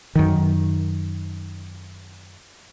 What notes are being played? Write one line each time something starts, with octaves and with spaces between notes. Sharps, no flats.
F#2 D#3